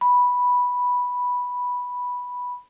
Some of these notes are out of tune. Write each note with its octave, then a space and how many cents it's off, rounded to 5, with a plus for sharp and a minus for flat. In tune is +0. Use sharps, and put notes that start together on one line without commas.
B5 -5